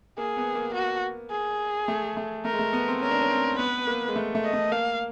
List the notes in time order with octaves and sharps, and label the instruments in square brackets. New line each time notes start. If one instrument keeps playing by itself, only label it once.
[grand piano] A#3 [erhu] G#4
[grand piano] B3
A#3
[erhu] F#4
G#4
[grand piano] A3
A3
[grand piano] A3 [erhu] A#4
[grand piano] G#3
A3
B3
C4
[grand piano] C#4 [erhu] A#4
[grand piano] D4
C#4
C4
[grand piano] B3 [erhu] B4
[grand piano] A#3
G#3
A3
A3
[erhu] D#5
[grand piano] A3
[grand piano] A#3 [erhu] F5